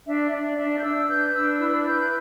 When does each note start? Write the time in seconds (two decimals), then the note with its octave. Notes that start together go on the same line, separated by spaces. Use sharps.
0.07 D4 E5
0.32 D4 D5
0.58 D4 E5
0.80 G6
0.83 D4 E6
1.09 B4 G6
1.35 D4 E6
1.60 E4 E6
1.86 B4 G6